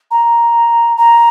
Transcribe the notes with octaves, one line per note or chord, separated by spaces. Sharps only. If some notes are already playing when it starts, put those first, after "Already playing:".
A#5
A#5